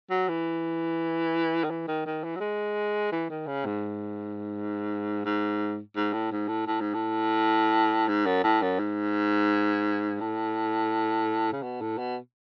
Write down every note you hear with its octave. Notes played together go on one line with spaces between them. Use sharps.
F#3
E3
D#3
E3
D#3
D#3
E3
F#3
G#3
E3
D#3
C#3
G#2
G#2
G#2
A2
G#2
A2
A2
G#2
A2
G#2
F#2
A2
F#2
G#2
A2
C#3
B2
A2
B2